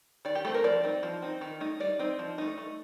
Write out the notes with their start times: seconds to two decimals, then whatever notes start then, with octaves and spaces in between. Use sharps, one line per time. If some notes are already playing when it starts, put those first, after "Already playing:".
0.25 D#3 D5
0.35 G4
0.45 A3 C4 A4
0.54 A#4
0.64 F3 D5
0.84 C4 D#4
1.03 F3
1.22 C4 D#4
1.41 D#3
1.60 A3 D#4
1.80 G3 D5
1.99 C4 D#4
2.19 F3
2.38 A3 D#4
2.58 A3